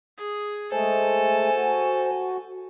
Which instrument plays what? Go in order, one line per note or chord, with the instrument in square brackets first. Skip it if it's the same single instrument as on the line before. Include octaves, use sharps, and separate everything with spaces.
[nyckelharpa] G#4
[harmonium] G#3 A3 [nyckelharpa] A4 [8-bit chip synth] C5 [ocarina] G#5
[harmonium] F#4